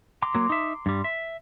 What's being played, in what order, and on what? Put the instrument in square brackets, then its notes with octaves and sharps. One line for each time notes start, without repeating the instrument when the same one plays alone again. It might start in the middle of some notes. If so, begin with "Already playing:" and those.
[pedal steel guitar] A#5 C6 D6
[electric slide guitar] F#3 A#3
D#4 E5
G2 G3
E5